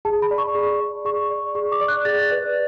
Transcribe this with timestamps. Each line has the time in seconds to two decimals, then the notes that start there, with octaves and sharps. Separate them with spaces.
0.05 G#4 A5
0.22 B5
0.31 D5
0.38 C#6
0.55 G#4
0.80 D5
1.05 G#4 C#6
1.30 D5
1.55 G#4 C#6
1.72 D6
1.81 D5
1.88 F#6
2.05 G#4 A6
2.30 B4 D5